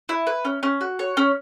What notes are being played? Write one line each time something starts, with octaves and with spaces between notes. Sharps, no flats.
E4
B4
C#4
C#4
F#4
C#5
C#4